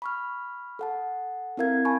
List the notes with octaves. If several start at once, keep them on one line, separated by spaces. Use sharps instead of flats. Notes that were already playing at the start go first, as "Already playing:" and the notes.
B5 C#6 F6
A4 F#5 A5
C4 E4 A#4 F5 G#6
G#5 A5 B5 C#6